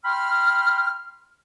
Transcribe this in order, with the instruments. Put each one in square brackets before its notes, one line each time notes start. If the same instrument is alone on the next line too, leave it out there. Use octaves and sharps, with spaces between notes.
[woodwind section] G5 B5 C6 F6